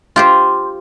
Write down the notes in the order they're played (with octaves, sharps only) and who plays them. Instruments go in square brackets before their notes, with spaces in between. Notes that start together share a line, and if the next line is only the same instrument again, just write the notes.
[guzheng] F4 G4 C5